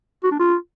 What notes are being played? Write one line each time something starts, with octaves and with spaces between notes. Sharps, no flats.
F#4
D4
F4